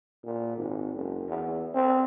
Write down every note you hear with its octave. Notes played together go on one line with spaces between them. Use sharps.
A#2
G#1
F#1
E2
C4